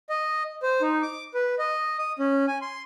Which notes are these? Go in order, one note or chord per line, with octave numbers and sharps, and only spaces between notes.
D#5
C5
D#4
D6
B4
D#5
D#6
C#4
G#5
C6